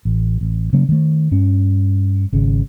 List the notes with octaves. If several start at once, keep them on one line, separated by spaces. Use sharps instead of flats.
A1
A1
C#3 F#3 A#3 C#4
D#3 A3
G2 C#4
G#1 C#3